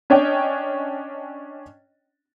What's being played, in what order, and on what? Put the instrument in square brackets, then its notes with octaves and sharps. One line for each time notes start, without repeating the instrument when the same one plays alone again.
[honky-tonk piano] C#4 D4 C#5 D#5 G5